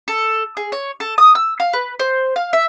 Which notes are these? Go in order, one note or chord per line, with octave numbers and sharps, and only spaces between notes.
A4
G#4
C#5
A4
D#6
E6
F5
B4
C5
F5
E5